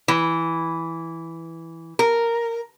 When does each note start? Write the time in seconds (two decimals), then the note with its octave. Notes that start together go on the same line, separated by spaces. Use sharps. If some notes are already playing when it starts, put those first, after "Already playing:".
0.08 E3
1.99 A#4